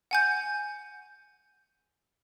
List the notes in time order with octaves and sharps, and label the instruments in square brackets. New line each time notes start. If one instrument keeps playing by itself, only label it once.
[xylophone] F#5 G#5 G6